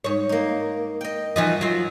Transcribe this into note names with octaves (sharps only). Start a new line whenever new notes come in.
G#2 C#5
A#3 D#4
D#5 G5
E3 F3 D#4 F#4
F#3 F4